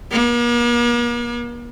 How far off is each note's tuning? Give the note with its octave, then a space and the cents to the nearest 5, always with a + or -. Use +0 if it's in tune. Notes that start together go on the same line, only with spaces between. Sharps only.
A#3 +45